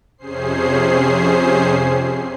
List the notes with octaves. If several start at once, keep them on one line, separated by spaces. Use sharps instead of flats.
F2 C3 C#4 G#4 C5 C7